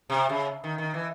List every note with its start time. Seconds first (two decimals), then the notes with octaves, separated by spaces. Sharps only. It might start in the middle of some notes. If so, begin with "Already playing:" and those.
0.10 C3
0.29 C#3
0.64 D#3
0.78 D#3
0.94 E3